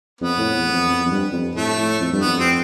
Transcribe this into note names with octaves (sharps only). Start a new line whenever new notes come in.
F2 B3
A2
E2
F2
F2
F2
G2
F2
A2 A3
A2
F2
G2
F2 B3
C4